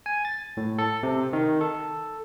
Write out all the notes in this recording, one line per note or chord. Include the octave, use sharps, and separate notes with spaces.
G#5
A6
A2
A4
C3
D#3
A4